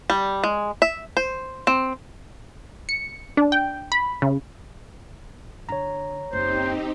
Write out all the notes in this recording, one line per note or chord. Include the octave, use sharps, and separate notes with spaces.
G3
G#3
E5
C5
C4
C#7
D4
G5
B5
C#3
D3 C#5 A#5
F#1 C4 D#4 G4 C5